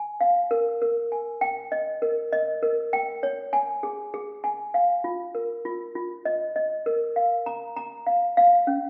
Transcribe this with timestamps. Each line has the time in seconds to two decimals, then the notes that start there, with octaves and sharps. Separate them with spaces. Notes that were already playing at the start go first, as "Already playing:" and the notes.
Already playing: G#5
0.21 F5
0.51 A#4
0.82 A#4
1.12 G#5
1.41 G5
1.72 D#5
2.02 A#4
2.32 D#5
2.63 A#4
2.93 G5
3.23 C#5
3.53 G#5
3.83 G#4
4.14 G#4
4.44 G#5
4.74 F5
5.04 F4
5.35 A#4
5.65 F4
5.95 F4
6.25 D#5
6.56 D#5
6.86 A#4
7.16 F5
7.46 A#5
7.77 A#5
8.07 F5
8.37 F5
8.67 C#4